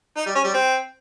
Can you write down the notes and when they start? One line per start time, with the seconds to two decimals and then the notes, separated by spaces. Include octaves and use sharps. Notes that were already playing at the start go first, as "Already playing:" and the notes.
0.17 D#4
0.26 G3
0.35 C#4
0.44 G3
0.53 C4